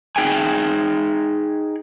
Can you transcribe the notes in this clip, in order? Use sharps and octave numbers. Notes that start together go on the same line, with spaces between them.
D#4 G#4 G5 G#5